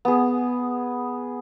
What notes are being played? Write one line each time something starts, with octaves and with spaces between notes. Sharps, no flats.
B3 G#4